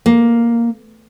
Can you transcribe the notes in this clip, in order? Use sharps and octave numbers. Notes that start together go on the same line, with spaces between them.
A#3